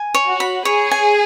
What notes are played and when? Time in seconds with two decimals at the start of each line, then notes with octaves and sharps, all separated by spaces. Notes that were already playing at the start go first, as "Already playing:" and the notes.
Already playing: G#5
0.14 C#5
0.27 F#4
0.40 B5
0.65 G#4 C#5
0.91 G#5